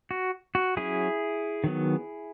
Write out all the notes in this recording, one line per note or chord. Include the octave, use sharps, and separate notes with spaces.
F#4
F#4
F#3 C#4 E4 G#4
D#3 F#3 B3